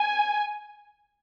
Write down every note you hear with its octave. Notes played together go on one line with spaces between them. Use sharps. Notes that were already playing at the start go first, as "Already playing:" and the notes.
Already playing: G#5